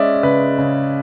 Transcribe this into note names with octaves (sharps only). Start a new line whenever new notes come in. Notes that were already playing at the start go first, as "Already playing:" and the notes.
Already playing: G#3 C#4 D5 E5
C#3 B4
C#3